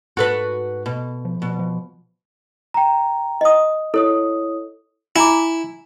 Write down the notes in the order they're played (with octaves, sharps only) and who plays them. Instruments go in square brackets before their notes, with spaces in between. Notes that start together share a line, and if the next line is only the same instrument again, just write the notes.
[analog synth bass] G#2 [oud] F#4 A4 B4
[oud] B2
[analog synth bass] F3
[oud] B2
[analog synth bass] F3
[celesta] G5 A#5
[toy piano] D#5 D#6
[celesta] E4 C#5 D#6 [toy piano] A4
[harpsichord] E4 [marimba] G#5 A#5 D6